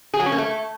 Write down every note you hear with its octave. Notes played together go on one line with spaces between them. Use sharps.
G#4
F#3
C#4
A#3
A3